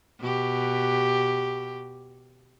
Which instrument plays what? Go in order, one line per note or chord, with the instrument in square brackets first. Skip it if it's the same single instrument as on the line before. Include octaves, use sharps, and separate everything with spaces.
[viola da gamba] B2 G4